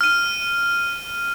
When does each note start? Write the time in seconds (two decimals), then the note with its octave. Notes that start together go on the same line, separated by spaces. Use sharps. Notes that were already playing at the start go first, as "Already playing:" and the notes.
0.01 F6 D#7